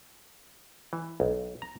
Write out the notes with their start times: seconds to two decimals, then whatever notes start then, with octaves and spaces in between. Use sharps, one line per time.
0.93 E3
1.20 B1
1.62 A#5